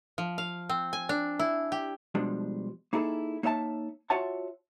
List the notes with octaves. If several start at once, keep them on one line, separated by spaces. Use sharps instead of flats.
F3
F5
C4
G#5
D4
E4
G4
B2 F3 G3 G#3 D4
A#3 D#4 E4 G#4 A4
A#3 D#4 C#5 E5 F#5 A5
F4 F#4 C#5 E5 F#5 A5